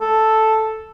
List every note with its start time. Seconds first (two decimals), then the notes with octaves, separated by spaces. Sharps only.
0.01 A4